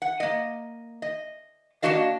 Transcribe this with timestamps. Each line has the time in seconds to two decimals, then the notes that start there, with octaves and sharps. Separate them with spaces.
0.02 F#5
0.20 A#3 D#5
1.02 D#5
1.82 A#3 B3 D4 F#4 D#5 F5